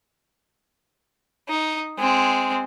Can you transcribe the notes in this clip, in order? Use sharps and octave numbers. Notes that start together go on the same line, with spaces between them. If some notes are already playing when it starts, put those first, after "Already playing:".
D#4
G#3 C4